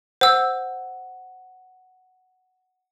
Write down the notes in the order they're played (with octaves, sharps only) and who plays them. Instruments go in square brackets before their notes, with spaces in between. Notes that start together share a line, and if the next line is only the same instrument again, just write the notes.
[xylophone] C5 E6 [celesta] F#5